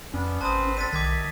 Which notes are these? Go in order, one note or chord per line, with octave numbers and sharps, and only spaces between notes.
F2 B3 C#4 D4
G#1 C4 B4 C5 A5 D#6
C4 D4 A4 A6 B6 D#7
B1 D#3 D#5 E5 D6 G#6 B6